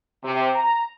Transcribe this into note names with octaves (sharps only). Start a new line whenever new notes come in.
C3
A#5